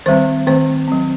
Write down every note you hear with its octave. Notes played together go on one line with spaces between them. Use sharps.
D#3 G3 C4 C5
D#3 A3 C4 C5
F#3 C4